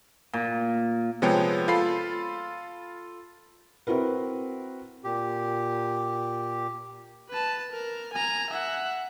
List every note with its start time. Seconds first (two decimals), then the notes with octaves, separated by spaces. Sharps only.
0.33 A#2
1.22 C3 F3 G#3 B3 C#5 G5
1.68 F4 A4 B5 C7
3.87 C4 E4 F#4 A#4 B4
5.04 A#2 G4
7.29 B4 A5
7.72 A#4
8.13 G#5 A#5
8.50 E5 F#5